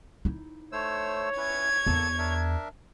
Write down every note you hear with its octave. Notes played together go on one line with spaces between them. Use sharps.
D#4 E4
A3 C5 C#5 E6
C#4 E4 B4 G#6
E2 A#3 A4 A5
D4 A#4 E5